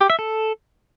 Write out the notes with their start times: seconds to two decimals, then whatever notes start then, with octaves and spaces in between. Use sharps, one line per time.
0.01 G4
0.10 E5
0.19 A4